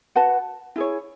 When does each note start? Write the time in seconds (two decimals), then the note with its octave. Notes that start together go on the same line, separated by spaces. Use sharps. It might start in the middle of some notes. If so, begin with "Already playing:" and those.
0.15 F#4 B4 F#5 A5
0.76 E4 G#4 C#5